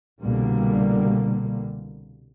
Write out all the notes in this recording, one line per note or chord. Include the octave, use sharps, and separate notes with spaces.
C2 B2 D3 G3 A#3